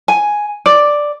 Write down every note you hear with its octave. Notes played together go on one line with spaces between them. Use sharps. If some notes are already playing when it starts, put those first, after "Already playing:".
G#5
D5